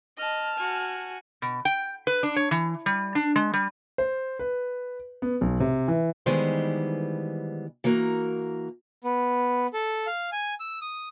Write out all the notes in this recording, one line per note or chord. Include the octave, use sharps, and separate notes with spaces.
D#5 A5 F6
F#4 G#5
B2
G5
B4
D4
C#5
E3
G3
D4
G#3
G3
C5
B4
B3
B1
C3
E3
D#3 E3 G3 G#3 B3 C5
E3 A#3 F#4 A#4
B3
A4
F5
G#5
E6
D#6